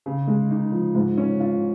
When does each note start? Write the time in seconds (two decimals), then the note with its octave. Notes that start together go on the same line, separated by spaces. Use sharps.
0.06 C#3
0.27 G#3
0.51 D#4
0.72 F3
0.95 G#2
1.17 C#4
1.40 F4